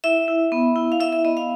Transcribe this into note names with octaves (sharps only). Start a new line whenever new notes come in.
E4 E5
E4
B3
E4
F5
E4 E5
E5
B3 D#5
F5